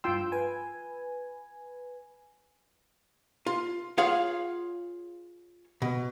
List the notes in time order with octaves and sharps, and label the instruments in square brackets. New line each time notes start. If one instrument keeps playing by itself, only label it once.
[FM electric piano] G2 E6 [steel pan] F4 G5 C6
[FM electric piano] B4 G#5
[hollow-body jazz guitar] F4
F4 G#4 C#5 F5 F#5
B2